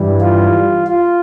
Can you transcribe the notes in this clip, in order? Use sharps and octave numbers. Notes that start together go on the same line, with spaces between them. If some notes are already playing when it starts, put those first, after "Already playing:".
Already playing: G2 E3 G3
F4
F4